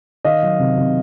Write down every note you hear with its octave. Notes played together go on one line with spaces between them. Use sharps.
D#3 D#5 F5
F#3
C3
C3